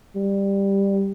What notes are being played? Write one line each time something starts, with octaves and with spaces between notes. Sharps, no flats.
G3